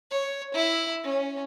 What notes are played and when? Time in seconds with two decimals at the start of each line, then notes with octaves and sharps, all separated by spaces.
0.10 C#5
0.54 E4
1.04 C#4